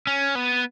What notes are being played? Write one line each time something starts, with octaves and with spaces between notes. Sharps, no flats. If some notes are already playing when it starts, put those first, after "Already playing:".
C#4
B3